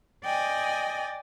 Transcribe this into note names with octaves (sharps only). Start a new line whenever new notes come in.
D5 D#5 G5 G#5